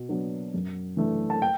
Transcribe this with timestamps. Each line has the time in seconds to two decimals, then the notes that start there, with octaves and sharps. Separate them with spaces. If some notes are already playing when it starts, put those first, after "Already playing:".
Already playing: B2
0.09 F#3 B3 D4
0.54 F#2
0.97 E3 A3 D4
1.30 A5
1.42 G5